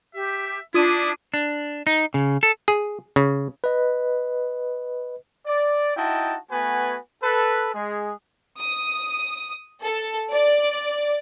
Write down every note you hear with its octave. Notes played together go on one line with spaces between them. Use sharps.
G4 E5
D4 E4 F4 D#6 D#7
D4
D#4
C#3
A4
G#4
C#3
B4 D#5
D5
D#4 E4 F#4 D#5 G5 A5
A3 B3 F#4 B4 G#5
A4 B4
G#3 G#4
D#6
A4
D5